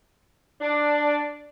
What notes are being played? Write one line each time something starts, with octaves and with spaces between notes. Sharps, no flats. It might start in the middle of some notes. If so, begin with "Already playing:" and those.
D4